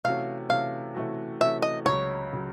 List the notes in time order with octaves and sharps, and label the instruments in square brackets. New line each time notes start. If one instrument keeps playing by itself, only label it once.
[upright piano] C3 E3 A3 C#4 F#4 [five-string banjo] F5
[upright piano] C3 E3 A3 C#4 F#4 [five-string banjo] F5
[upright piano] C3 E3 A3 C#4 F#4
[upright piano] C3 E3 A3 C#4 F#4 [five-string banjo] E5
[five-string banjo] D#5
[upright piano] C#2 C#3 F#3 [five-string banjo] C#5
[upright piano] C#3 F#3